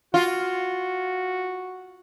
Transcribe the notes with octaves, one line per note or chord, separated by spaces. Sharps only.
F4 F#4